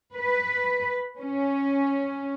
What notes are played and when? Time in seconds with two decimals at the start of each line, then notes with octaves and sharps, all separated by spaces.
0.13 B4
1.19 C#4